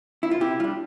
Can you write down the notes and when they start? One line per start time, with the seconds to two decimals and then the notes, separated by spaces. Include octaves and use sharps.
0.23 E4
0.31 F4
0.40 C3 E4 G4
0.59 G3 F4
0.64 D4